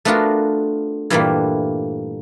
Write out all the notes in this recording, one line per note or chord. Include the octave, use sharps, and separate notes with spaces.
A3 B3 D4 F4 F#4 A#4
G2 A#2 E3 G3 A3 A#3